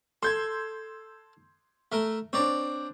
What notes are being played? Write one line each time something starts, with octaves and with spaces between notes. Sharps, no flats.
A4 C6 G6 G#6
A3 A#4
C4 D4 C#5 D5 A#5